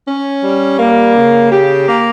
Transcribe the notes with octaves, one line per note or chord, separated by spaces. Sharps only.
C#4
G3
A#3
C#3
G4
A#3